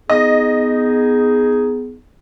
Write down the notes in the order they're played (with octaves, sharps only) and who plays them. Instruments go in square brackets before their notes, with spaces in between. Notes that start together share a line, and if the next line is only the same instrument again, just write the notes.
[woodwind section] B3 D#4 G#4 [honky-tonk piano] D#5